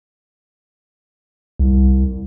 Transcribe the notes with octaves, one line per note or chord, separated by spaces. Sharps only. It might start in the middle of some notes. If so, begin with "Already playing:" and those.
C2